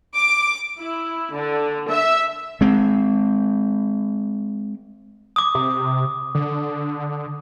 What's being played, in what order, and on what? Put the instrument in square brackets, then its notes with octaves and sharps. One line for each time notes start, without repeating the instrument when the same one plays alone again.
[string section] D6
E4
D3
E5
[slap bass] G#3 C4
[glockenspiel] D6 D#6
[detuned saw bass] C3
D3